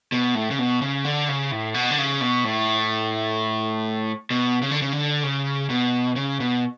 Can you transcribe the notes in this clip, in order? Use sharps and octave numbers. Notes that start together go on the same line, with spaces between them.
B2
A2
C#3
B2
C#3
D3
C#3
A2
B2
D3
C#3
B2
A2
B2
C#3
D3
C#3
D3
C#3
B2
C#3
B2